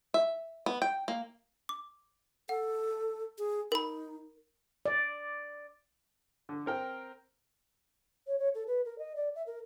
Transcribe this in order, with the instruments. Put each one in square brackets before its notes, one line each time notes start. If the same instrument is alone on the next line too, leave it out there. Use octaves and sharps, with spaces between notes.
[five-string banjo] E5
B3
G5
A#3
[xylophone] D6
[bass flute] A4 [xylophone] F#5
[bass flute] G#4
[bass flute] D#4 [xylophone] A#4 B5
[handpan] D5
[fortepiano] D3
C4 A#4 G5
[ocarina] C#5
C#5
A4
B4
A#4
D#5
D5
E5
A#4